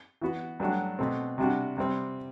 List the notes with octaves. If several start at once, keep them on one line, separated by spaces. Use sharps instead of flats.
E3 B3 F#4
G2 F#3 A3 D4 F#4
B2 A3 C4
C3 G3 D4 F#4
C3 G3 C4